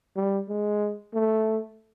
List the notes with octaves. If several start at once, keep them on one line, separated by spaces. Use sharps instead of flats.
G3
G#3
A3